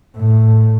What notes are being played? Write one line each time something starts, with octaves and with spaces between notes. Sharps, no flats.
A2